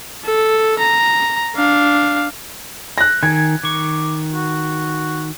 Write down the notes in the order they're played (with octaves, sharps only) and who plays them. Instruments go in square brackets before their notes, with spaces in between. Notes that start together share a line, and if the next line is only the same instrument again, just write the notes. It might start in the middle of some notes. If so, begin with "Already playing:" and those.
[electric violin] A4
A#5
D4 F5
[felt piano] F#6 A#6
[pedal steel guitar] D#3 [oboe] G#5 [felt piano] G#6
[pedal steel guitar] D#3 C#6 [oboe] D6
[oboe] F#4